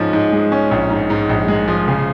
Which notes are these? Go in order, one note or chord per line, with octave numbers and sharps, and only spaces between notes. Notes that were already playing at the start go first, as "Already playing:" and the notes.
Already playing: G#2 F3 C#4
G#2
G#3
C#4
A#1
G#2
G#2
A#1
G#3
F3
C#3